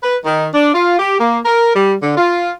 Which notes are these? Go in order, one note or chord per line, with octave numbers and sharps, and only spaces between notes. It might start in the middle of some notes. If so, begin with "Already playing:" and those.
B4
D#3
D4
F4
G4
A#3
A#4
G3
D3
F4